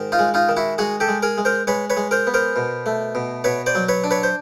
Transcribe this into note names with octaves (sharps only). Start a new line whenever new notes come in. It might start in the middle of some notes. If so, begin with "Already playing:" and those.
Already playing: G#2 D#3
D#4 F4
G#3
D#4 F4
D#3
E4 F#4
G#3 F#4 G#4
G4 A4
G#3
G#4 A#4
G#3
A#4 C5
G#3 B4 C#5
B4 C#5
G#3
A#4 C5
B3
A#4 C5
B2
A3
B2
B2 B4 C#5
C5 D5
F#3
B4 C#5
D4
B4 C#5
C5